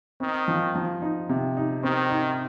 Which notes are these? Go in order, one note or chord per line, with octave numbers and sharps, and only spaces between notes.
D#3 C4
F3
F3
D#4
C3
D#4
D#3 C4
D#4